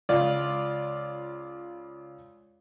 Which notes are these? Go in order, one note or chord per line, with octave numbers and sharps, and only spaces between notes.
C#2 F4 D5